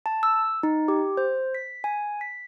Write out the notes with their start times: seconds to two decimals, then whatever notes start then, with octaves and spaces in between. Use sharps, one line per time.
0.06 A5
0.23 E6
0.63 D#4
0.88 G4
1.17 C5
1.55 B6
1.84 G#5
2.21 B6